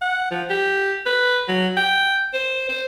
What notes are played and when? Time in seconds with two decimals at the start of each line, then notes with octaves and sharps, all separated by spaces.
0.02 F#5
0.31 F3
0.50 G4
1.06 B4
1.48 F#3
1.77 G5
2.33 C5
2.69 C5